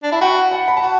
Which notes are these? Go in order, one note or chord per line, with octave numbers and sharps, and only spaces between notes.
D4
E4 A5
F#4 G5 B5
F#5 A5
B5
A5
F#4